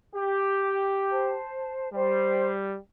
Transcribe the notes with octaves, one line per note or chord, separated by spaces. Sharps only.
G4
C5 A5
G3 C5